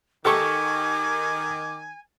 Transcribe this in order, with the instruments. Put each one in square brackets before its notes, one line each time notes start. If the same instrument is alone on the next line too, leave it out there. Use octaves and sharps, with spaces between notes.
[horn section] D#3 [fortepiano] G4 A4 C#6 [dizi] G#5 [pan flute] D6